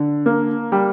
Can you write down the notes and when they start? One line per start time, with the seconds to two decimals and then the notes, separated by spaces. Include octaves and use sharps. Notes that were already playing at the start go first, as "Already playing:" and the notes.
Already playing: D3
0.26 A#3
0.72 G3